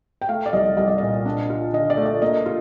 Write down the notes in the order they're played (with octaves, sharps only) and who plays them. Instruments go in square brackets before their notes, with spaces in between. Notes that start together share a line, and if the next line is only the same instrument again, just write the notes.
[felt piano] G5
A3 F5
D5
C2 D#5
C2 D#5
D5
A#2 D#5
D4
F4
D3 D#5
D5
A3
D5
A#3 D#5
F4